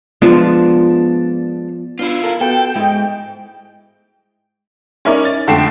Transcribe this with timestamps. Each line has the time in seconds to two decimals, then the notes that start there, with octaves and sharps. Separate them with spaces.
0.22 F3 G#3 B3 D4
1.99 B3 D4 E4 F4
2.24 A4 A#4 F5
2.41 B3 F#4 A4 F#5 G5
2.76 G#2 E4 D#5
5.05 C#4 D#4 E4 A#4 C#5 D5
5.25 A6
5.47 F2 D3 A3 G5 C7 E7